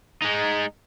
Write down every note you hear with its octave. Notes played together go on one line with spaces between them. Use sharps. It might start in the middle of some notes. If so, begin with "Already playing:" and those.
G#3 D#4